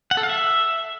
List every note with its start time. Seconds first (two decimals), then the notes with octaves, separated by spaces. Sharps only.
0.11 F#5
0.17 A4
0.23 F5
0.29 E5